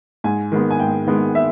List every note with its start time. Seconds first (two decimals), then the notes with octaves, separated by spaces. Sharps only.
0.24 G#2 G#5
0.52 D#3 G#3 B3
0.71 G#5
0.80 G#2 G5
1.07 D#3 G#3 B3
1.35 E5